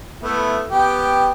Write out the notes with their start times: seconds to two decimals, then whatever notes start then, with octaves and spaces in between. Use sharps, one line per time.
0.23 A3 B3 E4
0.70 B3 G4 G5